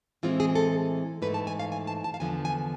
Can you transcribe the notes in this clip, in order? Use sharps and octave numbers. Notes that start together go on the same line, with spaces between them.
A2 E3 G#3 C4 F4
G#4
A4
G#2 E3 A3 B4
A5
G#5
F5
G#5
A5
A5
F5
E2 D3 F3 G#5
G#5